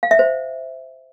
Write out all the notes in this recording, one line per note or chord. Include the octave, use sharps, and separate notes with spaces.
F5
E5
C5